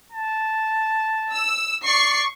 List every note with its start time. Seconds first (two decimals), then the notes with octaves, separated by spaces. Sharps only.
0.12 A5
1.34 E6
1.85 D5 C#6 C7